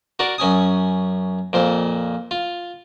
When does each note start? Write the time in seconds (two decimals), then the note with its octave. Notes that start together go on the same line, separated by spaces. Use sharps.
0.19 F#4 A#4 D5
0.38 F#2 C#4 G#5 D#6
1.53 F2 A#2 C5
2.31 F4